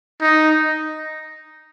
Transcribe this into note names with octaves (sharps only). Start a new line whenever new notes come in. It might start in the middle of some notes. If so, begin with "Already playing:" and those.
D#4